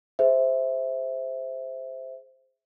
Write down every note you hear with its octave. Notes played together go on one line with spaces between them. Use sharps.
G#4 C5 E5